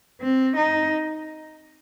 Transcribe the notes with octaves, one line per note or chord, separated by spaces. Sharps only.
C4
D#4